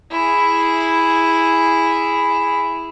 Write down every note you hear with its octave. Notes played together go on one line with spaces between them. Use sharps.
E4 G#4